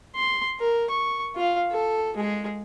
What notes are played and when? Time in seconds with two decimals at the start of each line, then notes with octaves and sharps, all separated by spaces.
0.15 C6
0.60 A#4
0.90 C#6
1.35 F4 F5
1.72 A4
2.17 G#3 G#4